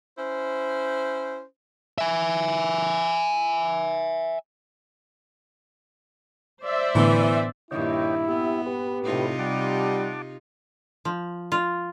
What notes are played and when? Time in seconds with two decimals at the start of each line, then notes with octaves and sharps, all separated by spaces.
0.17 C#4 E4 C5
1.98 E5 G#5
6.64 C5 D5 E5
6.95 A2 D3 E3 B3
7.71 G2 A#2 D#3 E4 C#5 D#5 G5
8.28 B3 G4 E5
8.66 G4 B4
9.05 A2 C3 D#4 F4
9.39 G3 F#5 A5 D6
11.05 F3
11.52 F4